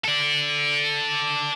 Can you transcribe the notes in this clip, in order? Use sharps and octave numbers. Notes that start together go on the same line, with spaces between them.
A4 D5